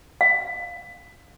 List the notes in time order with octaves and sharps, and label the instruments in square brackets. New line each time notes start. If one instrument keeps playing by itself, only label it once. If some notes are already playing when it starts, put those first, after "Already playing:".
[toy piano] F5